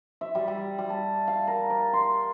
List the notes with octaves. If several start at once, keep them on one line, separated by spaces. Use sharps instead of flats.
E5
G3
G3
G3
A5
F5
A#4
D5
C6